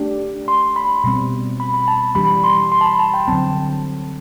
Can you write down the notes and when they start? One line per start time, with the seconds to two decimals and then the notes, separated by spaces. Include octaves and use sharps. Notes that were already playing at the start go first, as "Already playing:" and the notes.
Already playing: A3 D4 G4
0.48 C6
0.76 B5
1.04 B2 G3 C4
1.60 B5
1.74 B5
1.88 A5
2.15 E3 G3 D4 G4 B5
2.44 C6
2.72 C6
2.81 A5
2.86 B5
2.99 A5
3.14 G5
3.28 D3 F#3 C4 A5